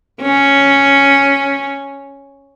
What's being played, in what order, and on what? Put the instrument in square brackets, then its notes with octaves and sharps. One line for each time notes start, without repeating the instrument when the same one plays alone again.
[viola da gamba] C#4